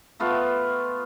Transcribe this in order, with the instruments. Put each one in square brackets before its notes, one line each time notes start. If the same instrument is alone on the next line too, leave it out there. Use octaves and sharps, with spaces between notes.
[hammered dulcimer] A3 B3 F4